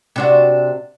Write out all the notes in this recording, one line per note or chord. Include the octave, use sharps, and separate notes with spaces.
C3 D4 F#4